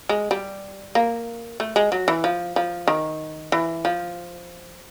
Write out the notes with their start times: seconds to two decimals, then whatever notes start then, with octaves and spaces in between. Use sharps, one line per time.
0.09 G#3
0.31 G3
0.95 A#3
1.60 A3
1.76 G#3
1.92 F#3
2.08 E3
2.24 F3
2.56 F3
2.88 D#3
3.52 E3
3.85 F3